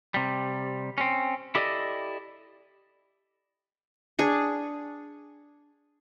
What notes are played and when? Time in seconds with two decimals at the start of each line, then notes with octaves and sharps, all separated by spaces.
0.14 C3 G3
0.98 C4 C#4
1.55 E4 G4 A4 D5 D#5
4.19 D4 G#4 C#6